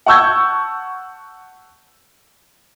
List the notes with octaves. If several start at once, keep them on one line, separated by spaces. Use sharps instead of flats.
F#5 A5 C#6 E6 G6 G#6